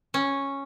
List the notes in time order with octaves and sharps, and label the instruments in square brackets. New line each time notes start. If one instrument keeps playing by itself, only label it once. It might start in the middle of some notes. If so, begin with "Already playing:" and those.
[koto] C#4